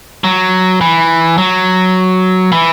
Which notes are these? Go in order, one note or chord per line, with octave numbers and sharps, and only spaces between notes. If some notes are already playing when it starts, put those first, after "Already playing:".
F#3
E3
F#3
E3